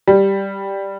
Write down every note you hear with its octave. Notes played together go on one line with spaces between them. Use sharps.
G3